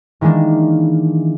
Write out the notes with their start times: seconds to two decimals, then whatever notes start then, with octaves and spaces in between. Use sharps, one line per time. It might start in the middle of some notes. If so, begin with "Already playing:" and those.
0.21 D#3 E3 G#3 A#3 D4